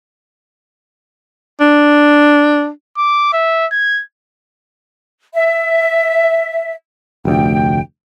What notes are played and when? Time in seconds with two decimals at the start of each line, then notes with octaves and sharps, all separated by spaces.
1.61 D4
2.98 D6
3.33 E5
3.72 G#6
5.34 E5
7.25 F1 D2 G5